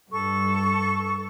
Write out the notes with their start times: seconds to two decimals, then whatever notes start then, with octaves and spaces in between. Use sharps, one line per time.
0.10 G2 A4 C#6